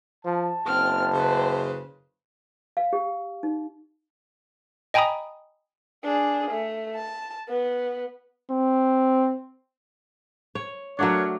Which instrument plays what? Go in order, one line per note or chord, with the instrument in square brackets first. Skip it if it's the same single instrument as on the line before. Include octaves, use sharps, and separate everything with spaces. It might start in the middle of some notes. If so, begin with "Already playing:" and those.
[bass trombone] F3 [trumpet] A5
[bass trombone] F#1 [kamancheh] C4 F6
[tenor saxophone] C#3 [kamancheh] B4 C5
[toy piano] F5
G4
D#4
[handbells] D#5 G5 G#5 A#5 B5 D#6
[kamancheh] D4 G#4
A3
A5
B3
[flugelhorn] C4
[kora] C#5
[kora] F#3 A3 D4 [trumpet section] A#4 C#5 F#5